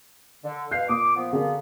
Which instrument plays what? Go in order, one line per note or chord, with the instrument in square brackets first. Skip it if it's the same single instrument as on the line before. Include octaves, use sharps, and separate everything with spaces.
[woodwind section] D3
[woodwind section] B2 F5 [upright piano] F#6 G6 C7
[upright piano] A#2 D#6 [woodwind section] D6
[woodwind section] F3 B3
[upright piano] D3 F#4 G#4 [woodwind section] A#3 B3